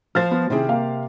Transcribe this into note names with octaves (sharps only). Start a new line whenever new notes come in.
F3 C5 F6 A6
B3
C3 D#3 C4 E4 G#4
A#3 F5